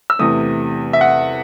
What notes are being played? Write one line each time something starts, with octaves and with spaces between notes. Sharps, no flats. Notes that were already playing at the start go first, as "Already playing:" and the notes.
E6
E2 C3 E3 A3 D#6
E5
F#5